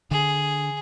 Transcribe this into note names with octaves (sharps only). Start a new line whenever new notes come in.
D3 G#4